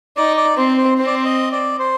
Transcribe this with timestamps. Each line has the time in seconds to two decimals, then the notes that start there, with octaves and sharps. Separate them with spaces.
0.17 D#4 D5
0.37 D5
0.57 C4 C5
0.78 C5
0.98 C4 C5
1.07 D5
1.14 C5
1.25 D#5
1.52 D5
1.79 C5